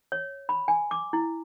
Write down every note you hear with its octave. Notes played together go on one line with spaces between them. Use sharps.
C#5
B5
G#5
D6
E4